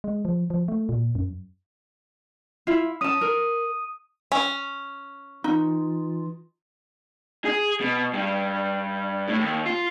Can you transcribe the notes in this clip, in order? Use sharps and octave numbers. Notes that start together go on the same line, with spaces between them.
G#3
F3
F3
A3
A#2
F#2
E4 F4
C#4 A5 D#6 D#7
A#4
C#4
E3 D#4 F4
G#4
B2
G2
A2
D#2
F4